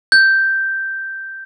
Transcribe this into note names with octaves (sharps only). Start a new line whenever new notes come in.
G6